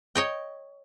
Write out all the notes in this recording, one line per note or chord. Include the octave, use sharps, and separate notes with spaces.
C#5 D#5 G5